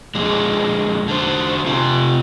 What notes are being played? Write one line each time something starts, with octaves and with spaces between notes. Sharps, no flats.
F2 A#2 G#3
D3 C5
C3 C4 F4